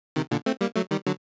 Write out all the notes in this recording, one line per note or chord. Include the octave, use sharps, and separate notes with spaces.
C3 D#3
A#2 D3
A3 C4
G3 A#3
F#3 A3
D#3 G3
D3 F#3